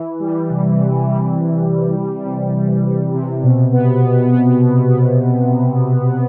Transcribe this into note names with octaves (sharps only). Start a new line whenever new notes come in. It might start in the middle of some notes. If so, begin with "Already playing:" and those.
Already playing: E3
G3
C3
C3
G3
C3
C3
E3
C3
C3
G3
C3
B2
B3
B2
B3
B2
B3
B2
B2